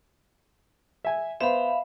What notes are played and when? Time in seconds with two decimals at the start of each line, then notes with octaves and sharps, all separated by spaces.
1.05 E5 G#5
1.41 B3 C5 E5 F5 B5